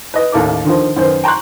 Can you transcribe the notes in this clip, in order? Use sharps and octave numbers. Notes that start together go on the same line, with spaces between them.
B4 D#5
A1 D#2 E4 A4 A#4 D6
D3 D#3 F3
F#2 D#3 B4 C5
G5 A#5 C6 C#6 F#6